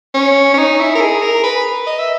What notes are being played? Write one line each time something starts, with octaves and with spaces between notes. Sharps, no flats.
C#4
C#4
D#4
E4
A#4
G#4
A#4
B4
D#5
E5